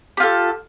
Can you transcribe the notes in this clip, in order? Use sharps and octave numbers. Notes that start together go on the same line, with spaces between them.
F4 G4 A4